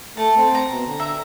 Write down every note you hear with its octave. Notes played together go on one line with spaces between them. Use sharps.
A3 A5
C4
A#5
B2
D3
E5 A#5